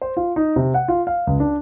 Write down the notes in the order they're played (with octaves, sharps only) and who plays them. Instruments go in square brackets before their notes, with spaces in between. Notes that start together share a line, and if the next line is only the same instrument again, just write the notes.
[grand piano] C5
F4
D#4
C3
F#5
F4
F5
C#2
D4